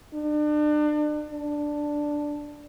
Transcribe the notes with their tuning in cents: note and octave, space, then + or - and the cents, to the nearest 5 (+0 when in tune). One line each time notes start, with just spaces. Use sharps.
D4 +35
D4 +0